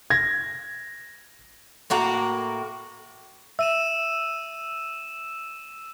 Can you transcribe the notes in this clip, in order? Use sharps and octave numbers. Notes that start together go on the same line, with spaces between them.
G#6 A#6
A2 A#3 F#4 A#5
E5 E6 D#7 E7